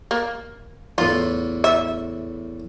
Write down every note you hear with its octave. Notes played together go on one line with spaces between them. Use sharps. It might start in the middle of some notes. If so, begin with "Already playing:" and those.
A#3
E2 A2 F4
E5